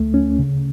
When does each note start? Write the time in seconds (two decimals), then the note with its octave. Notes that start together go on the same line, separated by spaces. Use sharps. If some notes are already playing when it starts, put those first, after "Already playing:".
Already playing: D2 A3
0.14 C#4
0.39 C#3